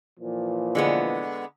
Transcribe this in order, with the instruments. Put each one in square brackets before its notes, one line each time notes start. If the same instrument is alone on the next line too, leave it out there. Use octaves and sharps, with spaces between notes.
[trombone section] A#2 E3 F3
[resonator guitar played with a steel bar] D3 G#3 B3